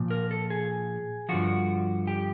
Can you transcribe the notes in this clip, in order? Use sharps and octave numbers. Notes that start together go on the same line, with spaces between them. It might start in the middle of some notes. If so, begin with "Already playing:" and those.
Already playing: A#2 F3
A#4
A4
G#4
G2 D3 F3 F#4
G4